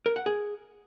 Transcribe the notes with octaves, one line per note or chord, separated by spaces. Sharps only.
A#4
F#5
G#4